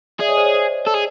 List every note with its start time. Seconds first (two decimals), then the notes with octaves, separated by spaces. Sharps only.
0.20 G#4 D5 E5
0.29 C#5 D#5
0.37 C5 D5
0.46 C#5
0.54 C5
0.87 A4
0.95 G#4